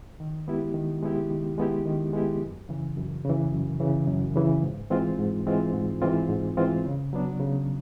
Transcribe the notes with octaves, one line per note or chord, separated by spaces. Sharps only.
D#3
G#3 B3 E4 G4
D#3
G#3 B3 E4 G4
D#3
G#3 B3 E4 G4
D#3
G#3 B3 E4 G4
F#2
C#3 E3
F#2
C#3 E3
F#2
C#3 E3
F#2
C#3 E3
G#2
E3 G#3 C4 F4
G#2
E3 G#3 C4 F4
G#2
E3 G#3 C4 F4
G#2
E3 G#3 C4 F4
C#3
F#3 B3 D4
C#3